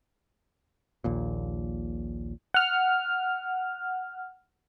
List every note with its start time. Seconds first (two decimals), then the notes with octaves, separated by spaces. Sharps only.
1.04 A#1 D#2 A#2
2.54 F#5 F6